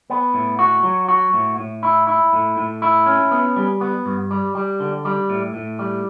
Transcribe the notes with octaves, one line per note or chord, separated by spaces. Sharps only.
B3
A2
F#4
F#3
F#4
A2
A2
E4
E4
A2
A2
E4
C#4
B3
G3
B3
G2
G3
G3
D3
G3
A2
A2
G3